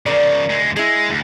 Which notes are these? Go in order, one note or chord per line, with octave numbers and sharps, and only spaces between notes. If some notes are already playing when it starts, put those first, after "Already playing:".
C#3 F3 A#4 D5
D2 G#3
G#3 E4 G#4
D2